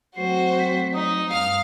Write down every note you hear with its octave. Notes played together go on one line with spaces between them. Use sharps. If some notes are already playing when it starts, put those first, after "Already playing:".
F#3 A3 C4 F#4 C5 C7
B6
D#4 D#6
G2 F5 F6